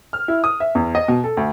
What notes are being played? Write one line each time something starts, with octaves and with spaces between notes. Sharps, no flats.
F6
E4
D#6
E5
E2
D#5
B2
A4
D2